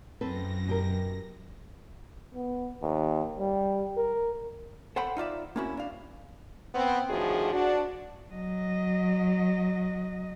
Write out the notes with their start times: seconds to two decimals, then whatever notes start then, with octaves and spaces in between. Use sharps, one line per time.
0.21 F#2 C4 A4 B4 A#6
0.68 B2 G4 A#4
2.35 B3
2.82 D#2
3.39 G3
3.97 A#4
4.96 A4 C5 F#5 G5 B5
5.17 D#4 F4 D5 E5
5.56 A#3 C4 C#4 E4 F#4
5.77 D4 F5
6.74 B3 C4
7.10 A2 D3 D#3 F3 F#4 G#4
7.53 D4 F#4
8.32 F#3 D#5